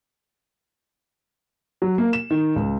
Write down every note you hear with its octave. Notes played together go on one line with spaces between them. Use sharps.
F#3
A#3
E7
D#3
C#2